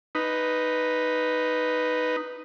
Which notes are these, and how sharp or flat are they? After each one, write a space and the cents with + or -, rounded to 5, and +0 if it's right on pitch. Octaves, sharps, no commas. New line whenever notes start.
D#4 +0 B4 +0